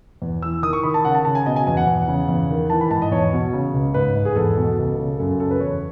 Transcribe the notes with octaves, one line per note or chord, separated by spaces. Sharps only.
E2
E3 E6
D#3 D#6
C#6
D#3 B5
A5
C#3 F#5
A5
C#3 A5
G#5
B2 D#5
G#5
E2 G#5
F#5
E2
C#3
E2
D#3
E3 A5
B5
G#2 A5
D#5
E2 C#5
B2
C#3
C#2
G#2 B4
G#2
G#4
E2 A4
B2
C#2
C#3
F#2 A4
C#3 A4
B4
E2 C#5